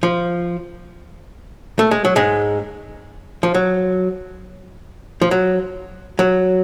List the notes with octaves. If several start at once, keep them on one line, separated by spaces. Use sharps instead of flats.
F3
A3
G#3
F#3
G#2 G#3
F3
F#3
F3
F#3
F#3